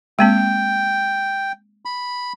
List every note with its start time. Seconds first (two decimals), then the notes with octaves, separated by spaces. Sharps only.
0.19 G#3 A#3 C4 G5
1.85 B5